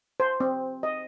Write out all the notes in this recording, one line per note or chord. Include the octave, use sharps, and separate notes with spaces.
C5
C4
D#5